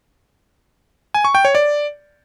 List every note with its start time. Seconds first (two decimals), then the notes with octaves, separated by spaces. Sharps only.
1.14 G#5
1.25 C#6
1.35 G5
1.45 C#5
1.55 D5